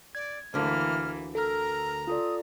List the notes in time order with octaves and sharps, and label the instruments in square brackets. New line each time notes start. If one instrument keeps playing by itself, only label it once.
[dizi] D5 [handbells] G#6
[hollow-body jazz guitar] D2 D3 [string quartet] E3 A#3 [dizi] F6
[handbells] A4 F6 [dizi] A#4 [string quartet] A#5
[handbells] F4 A4 D5 [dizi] D#6